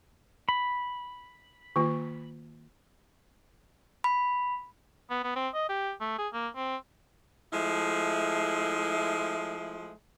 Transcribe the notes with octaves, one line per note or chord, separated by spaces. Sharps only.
B5
D#3 A#3 F4
B5
B3
B3
C4
D#5
G4
A3
G#4
A#3
C4
F3 G#3 A3 E4